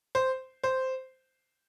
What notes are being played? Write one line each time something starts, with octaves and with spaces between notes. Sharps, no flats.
C5
C5